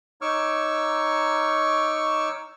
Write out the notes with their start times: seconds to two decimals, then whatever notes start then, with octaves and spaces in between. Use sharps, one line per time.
0.21 D#4 C#5 C#6 D6 E6 F6